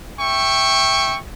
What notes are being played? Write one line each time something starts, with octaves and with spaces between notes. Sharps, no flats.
E5 G5 C#6